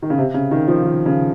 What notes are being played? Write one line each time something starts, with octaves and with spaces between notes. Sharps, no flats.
D#3
C#3
C3
C#3
D#3
F3
D#3
C#3